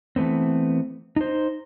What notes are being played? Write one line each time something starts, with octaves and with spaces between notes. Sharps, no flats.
E3 A3 B3 C4
D#4 C5